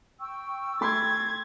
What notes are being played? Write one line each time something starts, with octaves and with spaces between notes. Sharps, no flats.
G5 C#6 E6
A3 B5 C6 G#6 A6